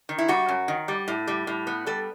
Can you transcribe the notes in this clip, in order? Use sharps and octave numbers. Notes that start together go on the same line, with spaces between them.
D#3
E4
G3 F#4
F#2
D#3
G3
A2
G3
A2
B3
G3 A4